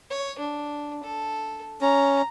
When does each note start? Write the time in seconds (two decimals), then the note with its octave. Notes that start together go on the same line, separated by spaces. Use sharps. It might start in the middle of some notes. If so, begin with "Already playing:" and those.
0.10 C#5
0.39 D4
1.03 A4
1.81 C#4 A#5